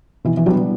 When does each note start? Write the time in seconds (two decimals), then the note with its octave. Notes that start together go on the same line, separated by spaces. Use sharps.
0.25 B2 E3
0.37 E3
0.46 F#3 G3 B3 D4